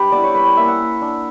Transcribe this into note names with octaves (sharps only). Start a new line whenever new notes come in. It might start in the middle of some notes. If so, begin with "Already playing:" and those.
Already playing: G3 D4 G4 B4
B3 E4 D5
C#5
G3 B4
D5
A#3 C#4 E5
F#5
A#3
D4